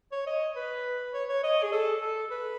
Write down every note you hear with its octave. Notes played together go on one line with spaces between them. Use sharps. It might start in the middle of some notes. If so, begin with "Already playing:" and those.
C#5
D#5
B4
C#5
C#5
D#5
G#4
A4
A4
B4